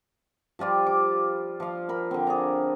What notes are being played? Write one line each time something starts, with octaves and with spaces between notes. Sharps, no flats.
F3 G3 F4 D5
D6
F3 F5
A#4 B5
D3 C4
G#4 D5 A#5